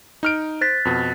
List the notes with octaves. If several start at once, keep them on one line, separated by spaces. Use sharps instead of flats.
D#4 F6 D7
C5 F#6 A6 B6
F2 B2